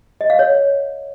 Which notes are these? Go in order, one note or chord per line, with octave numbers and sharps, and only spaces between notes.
D#5
F5
C#5